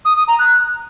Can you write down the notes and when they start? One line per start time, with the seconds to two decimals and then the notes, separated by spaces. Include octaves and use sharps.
0.05 D#6
0.16 D#6
0.28 A#5
0.39 F#6